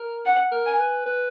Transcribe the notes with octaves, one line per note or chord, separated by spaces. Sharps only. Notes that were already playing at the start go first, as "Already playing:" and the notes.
Already playing: A#4
F#5
A#4
G#5
B4
B4